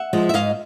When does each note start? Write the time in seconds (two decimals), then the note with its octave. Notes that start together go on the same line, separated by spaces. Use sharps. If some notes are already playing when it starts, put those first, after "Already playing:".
Already playing: E5 F#5
0.13 F3 G#3
0.29 E5
0.34 G#2 D#5 F5